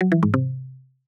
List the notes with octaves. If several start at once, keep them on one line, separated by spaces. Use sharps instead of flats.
F#3
E3
G#2
C3